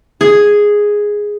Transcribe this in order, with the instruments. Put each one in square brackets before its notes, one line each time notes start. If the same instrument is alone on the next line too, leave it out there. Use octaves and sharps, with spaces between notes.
[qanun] G#4